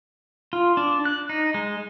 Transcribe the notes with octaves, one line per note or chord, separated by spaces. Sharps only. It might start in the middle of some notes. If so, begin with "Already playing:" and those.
F4
D4
F#6
D#4
G#3